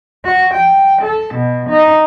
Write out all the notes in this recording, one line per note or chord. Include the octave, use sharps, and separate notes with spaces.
F#4
G5
A4
B2
D#4